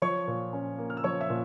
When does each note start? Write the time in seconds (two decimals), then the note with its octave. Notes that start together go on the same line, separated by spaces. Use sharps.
0.02 F3 C#5 C#6
0.28 A#2
0.53 C#4
0.78 A#3
0.90 F6
0.97 E6
1.04 F3 C#5 C#6
1.21 E5 E6
1.30 A#2